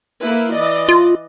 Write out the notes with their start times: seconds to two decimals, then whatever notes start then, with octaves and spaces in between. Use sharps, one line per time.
0.21 A#3 E4 B4
0.52 E3 D5 D#5
0.89 F4